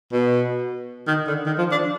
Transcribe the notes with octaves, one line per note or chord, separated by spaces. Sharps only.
B2
D#3
D3
D#3
F3
D4